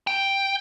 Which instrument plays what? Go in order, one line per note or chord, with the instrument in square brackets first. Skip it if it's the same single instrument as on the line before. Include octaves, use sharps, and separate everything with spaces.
[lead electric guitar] G5